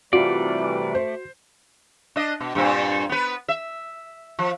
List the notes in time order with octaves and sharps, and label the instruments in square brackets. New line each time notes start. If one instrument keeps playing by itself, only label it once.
[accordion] C3 E3 G3 [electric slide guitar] A3 D5 [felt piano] F4 [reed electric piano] F#4
[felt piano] C5
[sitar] D4 D#5
B2
G2 A#2 C4
B3 B4
E5
F3